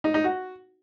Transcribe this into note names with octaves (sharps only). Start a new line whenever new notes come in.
D#4
D#4
F#4